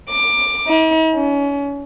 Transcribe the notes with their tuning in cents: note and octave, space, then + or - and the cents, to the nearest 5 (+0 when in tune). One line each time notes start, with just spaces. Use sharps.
D6 +15
D#4 +45
C#4 +30